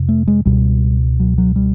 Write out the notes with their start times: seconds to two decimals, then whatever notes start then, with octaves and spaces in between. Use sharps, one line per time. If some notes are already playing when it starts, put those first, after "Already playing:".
Already playing: F2 C3
0.09 A3
0.27 G#3
0.45 C#2 B2 G3
1.20 F#3
1.38 F#3
1.56 G3